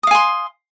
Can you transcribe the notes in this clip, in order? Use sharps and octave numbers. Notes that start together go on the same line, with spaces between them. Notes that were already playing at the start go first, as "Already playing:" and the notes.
F5 G#5 C6 D#6